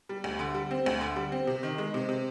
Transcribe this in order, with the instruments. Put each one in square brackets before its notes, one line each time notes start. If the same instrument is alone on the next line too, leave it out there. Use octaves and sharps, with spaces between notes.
[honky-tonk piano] G3
D2
D3
G3
C4
D2
D3
G3
C4
C3
D#3
G#3
C3
C3